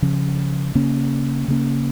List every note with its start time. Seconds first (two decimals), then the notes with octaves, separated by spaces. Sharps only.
0.02 C#3 F3 C#4
0.75 C#3 A#3 C#4
1.48 C#3 A#3 C#4